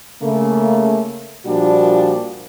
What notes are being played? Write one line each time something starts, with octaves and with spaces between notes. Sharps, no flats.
C#3 A3 A#3
A#2 F3 G3 A#3 D4 F#4